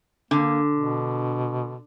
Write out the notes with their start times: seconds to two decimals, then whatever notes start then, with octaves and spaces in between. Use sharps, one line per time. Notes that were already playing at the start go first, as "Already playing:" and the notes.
0.31 D3 A#3 D4
0.75 B2